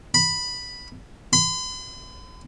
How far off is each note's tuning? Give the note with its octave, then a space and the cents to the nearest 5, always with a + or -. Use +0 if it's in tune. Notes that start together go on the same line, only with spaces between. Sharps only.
B5 +0
B5 +45